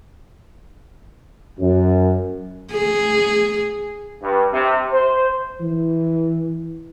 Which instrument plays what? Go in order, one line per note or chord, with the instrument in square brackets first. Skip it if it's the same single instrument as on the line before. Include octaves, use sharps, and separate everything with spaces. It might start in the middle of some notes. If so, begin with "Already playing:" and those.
[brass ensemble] F#2
[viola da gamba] G#4
[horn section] G2
C3
C5
[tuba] E3